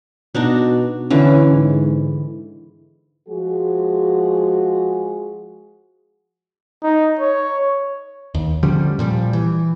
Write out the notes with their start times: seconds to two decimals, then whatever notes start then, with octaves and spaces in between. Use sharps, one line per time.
0.35 B2 D4 D#4 F#4
1.10 D3 E3 C#4
1.51 G#2
3.29 F3 G#3 F#4 G#4
6.83 D#4
7.19 C#5
8.34 D#2
8.63 D3 F3 G3 C#4
8.99 A#2 F3 G3
9.33 E3